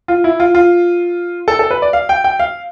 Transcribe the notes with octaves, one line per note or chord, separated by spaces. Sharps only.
F4
E4
F4
F4
A4
A4
B4
D5
F5
G5
G5
F5